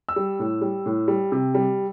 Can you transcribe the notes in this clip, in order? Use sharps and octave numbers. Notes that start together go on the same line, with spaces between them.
E6
G3
A2
G3
A2
G3
C3
G3